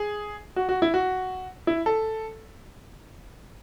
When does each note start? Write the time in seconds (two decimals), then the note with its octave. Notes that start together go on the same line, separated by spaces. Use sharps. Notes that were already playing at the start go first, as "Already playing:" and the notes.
Already playing: G#4
0.56 F#4
0.69 F#4
0.82 E4
0.94 F#4
1.67 E4
1.86 A4